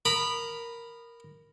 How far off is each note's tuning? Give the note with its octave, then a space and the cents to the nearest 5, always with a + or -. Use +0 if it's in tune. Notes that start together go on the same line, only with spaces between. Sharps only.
A#4 +0 B5 +0 D#6 -25